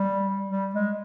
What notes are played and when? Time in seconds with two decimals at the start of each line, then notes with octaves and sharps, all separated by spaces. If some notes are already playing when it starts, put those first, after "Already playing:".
Already playing: G3
0.49 G3
0.74 G#3